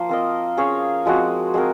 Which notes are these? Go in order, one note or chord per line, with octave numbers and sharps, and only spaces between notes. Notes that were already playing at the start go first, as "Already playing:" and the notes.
Already playing: F3 A#3 C5
C4 F4 A#4 D#5
C#4 G#4 C#5 F5
F3 G#3 C4 F#4
G#3 C4 F#4 A#4